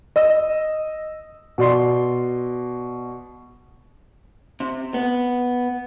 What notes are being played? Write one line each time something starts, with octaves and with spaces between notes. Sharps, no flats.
D#5 E6
B2 D5 C6
C3
B3